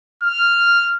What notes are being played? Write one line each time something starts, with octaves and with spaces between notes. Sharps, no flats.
F6